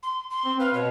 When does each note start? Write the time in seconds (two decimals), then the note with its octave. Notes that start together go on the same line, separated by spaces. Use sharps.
0.03 C6
0.30 C6
0.45 C4
0.60 B4 F5
0.74 B2 C#5